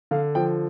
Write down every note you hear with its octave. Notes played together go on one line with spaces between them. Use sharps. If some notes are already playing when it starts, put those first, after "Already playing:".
D3 F5
F3 G5